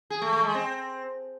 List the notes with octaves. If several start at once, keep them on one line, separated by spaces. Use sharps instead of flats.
G#4
A3
A3
G#3
C4